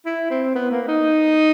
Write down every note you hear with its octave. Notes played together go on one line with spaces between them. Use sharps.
E4
C4
B3
A#3
D#4